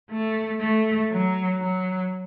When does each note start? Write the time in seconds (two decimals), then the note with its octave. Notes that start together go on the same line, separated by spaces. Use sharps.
0.11 A3
0.60 A3
1.11 F#3
1.61 F#3